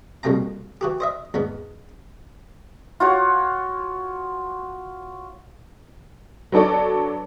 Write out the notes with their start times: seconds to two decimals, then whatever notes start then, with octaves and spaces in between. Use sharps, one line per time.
0.23 C2 F2 B2 A#3 G5 A#5
0.81 E3 F#4 G4
1.00 C5 D#5 E5
1.34 E2 G#2 B3
3.00 F4 F#4 C#5
6.52 F#3 B3 D4 A4 C#5 D5